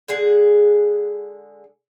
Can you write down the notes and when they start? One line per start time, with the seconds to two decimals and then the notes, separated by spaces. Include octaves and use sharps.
0.08 D3 G#3 G#4 F#5